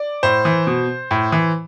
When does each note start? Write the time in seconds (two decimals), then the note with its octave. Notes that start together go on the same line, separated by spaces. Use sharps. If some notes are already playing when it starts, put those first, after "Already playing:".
Already playing: D5
0.23 A2 C5
0.45 E3
0.67 B2
1.11 A2
1.32 E3